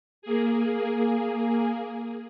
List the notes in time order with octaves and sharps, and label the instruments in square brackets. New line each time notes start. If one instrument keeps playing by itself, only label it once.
[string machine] A#3 G#4